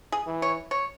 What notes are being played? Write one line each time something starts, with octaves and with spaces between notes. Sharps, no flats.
G#4
E3
C#5
C#5